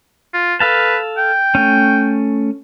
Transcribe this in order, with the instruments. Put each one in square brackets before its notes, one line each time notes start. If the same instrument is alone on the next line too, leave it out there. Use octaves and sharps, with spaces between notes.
[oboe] F4
[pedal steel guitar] A4 F5 A5 [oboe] B4
[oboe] G5
[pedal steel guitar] A3 C#4